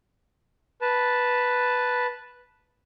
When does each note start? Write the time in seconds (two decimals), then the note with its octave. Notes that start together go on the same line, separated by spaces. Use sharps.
0.81 B4 A5